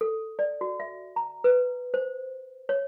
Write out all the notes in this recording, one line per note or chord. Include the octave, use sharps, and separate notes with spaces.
A4
D5
F#4
E5
A#5
B4
C5
C#5